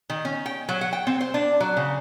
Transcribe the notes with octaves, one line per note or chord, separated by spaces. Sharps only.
D#3
C#4
G5
F#3
F#5
G5
C4
C5
D4
F#3
C#3